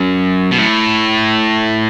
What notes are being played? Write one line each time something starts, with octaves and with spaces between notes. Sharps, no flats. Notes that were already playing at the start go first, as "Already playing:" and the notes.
Already playing: F#2
B2
A2